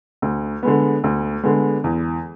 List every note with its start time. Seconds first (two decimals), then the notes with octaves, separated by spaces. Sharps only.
0.22 D2
0.63 D3 G#3 B3
1.04 D2
1.43 D3 G#3 B3
1.84 E2